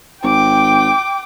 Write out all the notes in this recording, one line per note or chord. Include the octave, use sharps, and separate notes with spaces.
G#1 G5 D6